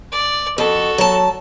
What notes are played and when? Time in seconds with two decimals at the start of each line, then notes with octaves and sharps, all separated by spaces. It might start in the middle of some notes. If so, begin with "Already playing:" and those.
0.12 D5
0.58 F2 F#4 A4
0.98 F#3 A5